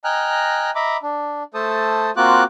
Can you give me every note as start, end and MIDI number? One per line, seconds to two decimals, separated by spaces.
0.04 0.70 75
0.04 0.70 79
0.04 0.70 80
0.04 0.70 82
0.04 0.70 89
0.04 0.70 90
0.75 0.97 75
0.75 0.97 76
0.75 0.97 82
0.75 0.97 83
0.75 0.97 86
1.02 1.43 62
1.54 2.10 57
1.54 2.10 69
1.54 2.10 72
1.54 2.10 81
1.54 2.10 87
2.17 2.44 58
2.17 2.44 60
2.17 2.44 65
2.17 2.44 66
2.17 2.44 86
2.17 2.44 90